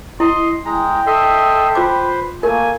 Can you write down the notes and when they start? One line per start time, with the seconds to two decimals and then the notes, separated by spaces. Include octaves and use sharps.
0.20 E4 D#5 C6
0.66 G#3 G5 A#5
1.07 A4 D#5 E5 C6
1.75 F4 B4 C5 D6
2.43 A3 A#3 A#4 G#5